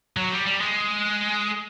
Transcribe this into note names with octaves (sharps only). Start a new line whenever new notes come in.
F#3
G3
G3
G#3